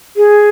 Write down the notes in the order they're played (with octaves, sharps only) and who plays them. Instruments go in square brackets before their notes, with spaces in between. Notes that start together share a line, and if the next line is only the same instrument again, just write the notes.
[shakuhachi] G#4